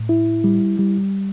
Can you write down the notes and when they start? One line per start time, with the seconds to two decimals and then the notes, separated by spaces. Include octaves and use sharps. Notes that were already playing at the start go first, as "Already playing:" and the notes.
Already playing: A2
0.09 E4
0.44 G3
0.79 G3